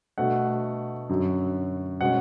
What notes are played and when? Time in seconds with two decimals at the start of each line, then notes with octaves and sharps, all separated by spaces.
0.18 B2 A3 D4 F#5
1.09 F#2 D3 F#3
2.01 B2 G#3 C#4 F#5